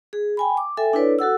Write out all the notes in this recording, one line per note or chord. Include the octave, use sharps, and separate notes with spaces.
G#4
G5 G#5 B5
D6
A4 E5 G5 G#5
D4 E4 A4 B4 C#5 D5
F#4 A4 F#5 E6